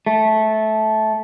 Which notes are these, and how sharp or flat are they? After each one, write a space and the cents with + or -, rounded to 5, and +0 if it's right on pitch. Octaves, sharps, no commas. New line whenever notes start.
A3 -15